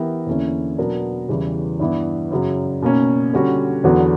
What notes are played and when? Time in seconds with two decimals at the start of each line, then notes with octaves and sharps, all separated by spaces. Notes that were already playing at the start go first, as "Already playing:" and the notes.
Already playing: E3 B3 E4 G4 A#4
0.27 E2 D3 A#3 C#4 E4
0.77 B2 F#3 B3 D4 A#4
1.28 E2 C#3 E3 G3
1.80 G2 E3 B3 E4
2.31 F#2 C#3 F#3
2.82 B2 A#3 C#4
3.33 D3 G3 C#4 F#4
3.84 E2 D3 F#3 B3 F#4